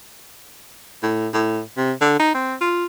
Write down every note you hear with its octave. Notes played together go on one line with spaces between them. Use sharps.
A2
A2
C3
D3
D#4
C4
F4